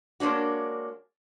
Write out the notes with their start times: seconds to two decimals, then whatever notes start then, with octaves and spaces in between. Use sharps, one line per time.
0.20 G#3 A#3 C#4 D4 F#4